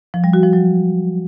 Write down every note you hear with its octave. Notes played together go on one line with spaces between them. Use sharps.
F3
G3
F#4
F3
F#3